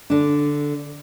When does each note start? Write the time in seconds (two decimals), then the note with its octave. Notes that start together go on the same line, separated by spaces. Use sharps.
0.10 D3 D4